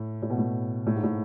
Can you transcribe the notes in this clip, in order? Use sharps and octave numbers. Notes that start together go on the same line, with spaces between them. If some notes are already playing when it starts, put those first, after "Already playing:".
Already playing: A2
A2
B2
A2
A2
G#2
A2